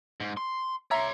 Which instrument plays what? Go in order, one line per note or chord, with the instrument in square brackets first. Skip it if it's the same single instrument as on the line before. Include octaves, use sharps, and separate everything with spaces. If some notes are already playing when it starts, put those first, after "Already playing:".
[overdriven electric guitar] G#2
C6
[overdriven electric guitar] C#5 C6 [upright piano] E5 A#5